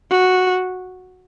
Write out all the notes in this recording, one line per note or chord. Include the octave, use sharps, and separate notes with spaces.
F#4